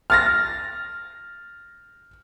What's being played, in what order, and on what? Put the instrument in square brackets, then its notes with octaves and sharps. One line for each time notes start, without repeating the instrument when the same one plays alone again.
[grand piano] F6 A6 A#6